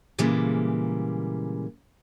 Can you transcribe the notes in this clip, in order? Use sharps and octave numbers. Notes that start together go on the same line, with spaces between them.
A#2 C#3 E3 G3 G#3 A#3